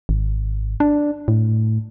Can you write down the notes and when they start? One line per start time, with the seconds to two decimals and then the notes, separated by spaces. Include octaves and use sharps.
0.09 G#1
0.80 D4
1.28 A2